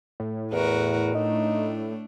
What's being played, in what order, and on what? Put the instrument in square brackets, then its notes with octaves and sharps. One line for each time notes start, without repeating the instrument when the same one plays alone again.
[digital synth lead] A2
[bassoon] E2 [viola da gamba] F#4 A#4 B4
[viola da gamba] A3 D4 [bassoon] D#4